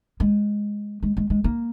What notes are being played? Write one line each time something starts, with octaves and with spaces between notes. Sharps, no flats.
G#3
G#3
G#3
G#3
A#3